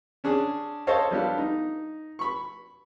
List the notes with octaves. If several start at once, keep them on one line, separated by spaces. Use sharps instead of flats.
C#4 D4 G#4
A4 C5 C#5 D#5 F5 A5
G3 B3 D4 F4 A4
D#4
B5 C#6